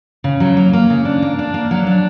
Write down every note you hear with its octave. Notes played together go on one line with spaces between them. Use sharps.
C#3
F#3
A#3
A#3
C#3
D4
A#3
D4
A#3
F#3
D4